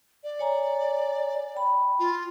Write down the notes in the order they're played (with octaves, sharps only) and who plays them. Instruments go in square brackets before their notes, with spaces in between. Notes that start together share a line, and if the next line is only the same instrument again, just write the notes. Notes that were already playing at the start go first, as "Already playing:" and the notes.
[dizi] D5
[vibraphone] C#5 G#5 A#5
G5 B5
[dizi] F4